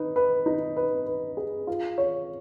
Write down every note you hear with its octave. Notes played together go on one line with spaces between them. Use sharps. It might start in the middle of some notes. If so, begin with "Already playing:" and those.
Already playing: D#4 B4
B4
D#4
B4
B4
G#4
F4
C#5